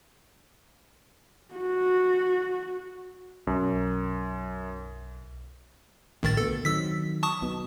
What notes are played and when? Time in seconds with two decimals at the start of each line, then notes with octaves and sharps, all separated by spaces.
1.55 F#4
3.47 B1 F#2
6.23 A#1 A2 D#3 A6
6.37 D2 B3 A4
6.65 D#3 F#3 C4 E6 B6
7.23 A5 C#6 D#6
7.42 B1 B2